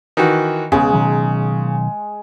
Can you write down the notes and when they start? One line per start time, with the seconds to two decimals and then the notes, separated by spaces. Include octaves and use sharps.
0.17 D#3 E3 F#4
0.72 E1 C#3 G#3 B3
0.93 B2 D#3 F#3